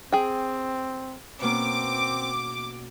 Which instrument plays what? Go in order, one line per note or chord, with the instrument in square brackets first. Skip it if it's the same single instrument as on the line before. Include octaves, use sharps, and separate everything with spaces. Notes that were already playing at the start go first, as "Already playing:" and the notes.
[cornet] C4 [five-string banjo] G#4 G5
[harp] B2 A#3 C#4 [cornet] C4 [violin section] D6